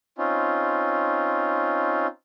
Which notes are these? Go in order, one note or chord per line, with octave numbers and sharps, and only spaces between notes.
C4 C#4 D#4 F4